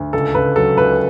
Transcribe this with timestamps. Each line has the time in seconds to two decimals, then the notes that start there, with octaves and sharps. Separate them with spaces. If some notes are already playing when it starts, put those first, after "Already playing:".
Already playing: D2
0.13 C#2 A4
0.35 C#2 B4
0.56 F#3 A4
0.77 C#2 B4